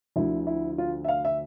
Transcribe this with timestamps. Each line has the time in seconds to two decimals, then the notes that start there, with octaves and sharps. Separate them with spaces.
0.16 D2 D3 F3 E4
0.47 E4
0.78 F4
1.04 E5
1.08 F5
1.25 E5